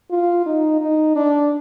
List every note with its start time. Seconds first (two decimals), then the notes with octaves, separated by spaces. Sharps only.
0.11 F4
0.46 D#4
0.81 D#4
1.16 D4